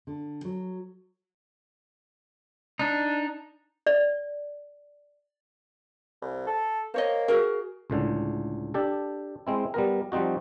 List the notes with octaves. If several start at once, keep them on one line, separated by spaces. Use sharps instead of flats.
D3
F#3
D4 D#4
D5
C2
A4
A#3 C5 C#5 D#5
F#4 G#4 A#4
C#2 A2 D3
D4 G4 A4
G#3 C4 E4
G3 B3 A#4
F3 G3 C4 D#4 F#4